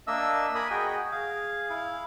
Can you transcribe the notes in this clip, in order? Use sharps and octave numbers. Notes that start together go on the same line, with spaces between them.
A#3 D4 D#5 E5 E6
A#4 G#5 B5 D#6
F#4 G#4 D#5 G5
G#4 F5
E4 F5